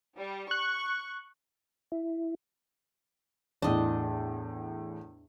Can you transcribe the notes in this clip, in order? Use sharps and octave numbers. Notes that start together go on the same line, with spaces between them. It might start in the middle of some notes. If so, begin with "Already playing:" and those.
G3
C#6 F#6
E4
E2 A2 D4 D#5